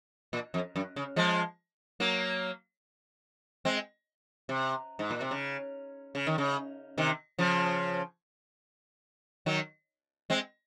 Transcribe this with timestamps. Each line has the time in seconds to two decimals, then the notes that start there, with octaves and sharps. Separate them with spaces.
0.33 A#2
0.54 F2
0.76 F#2
0.96 C#3
1.16 F3 G#3
2.00 F#3 A#3
3.65 G#3 C4
4.49 C3
4.99 G#2
5.11 A#2
5.21 C3
5.31 C#3
6.15 C#3
6.27 D#3
6.38 C#3
6.98 C3 D#3
7.39 C#3 F3
9.46 D#3 F#3
10.30 G#3 C4